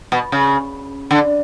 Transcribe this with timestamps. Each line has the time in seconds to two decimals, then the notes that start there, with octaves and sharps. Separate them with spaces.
0.12 B2
0.32 C#3
1.11 D3